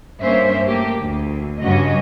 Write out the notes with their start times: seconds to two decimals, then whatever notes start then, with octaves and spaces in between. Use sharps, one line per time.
0.21 G2 A#3 C#4 C5 E5
0.66 A3 A#3 G4
1.00 D2
1.61 G2 C#3 C#4 F#4 D#5